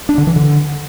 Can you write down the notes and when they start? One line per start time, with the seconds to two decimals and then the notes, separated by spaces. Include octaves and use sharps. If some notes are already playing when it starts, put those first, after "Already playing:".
0.09 D4
0.18 D3
0.27 E3
0.36 D3